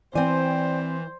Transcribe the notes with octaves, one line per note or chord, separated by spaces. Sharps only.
E3 C4 C5 D5 G5 G#5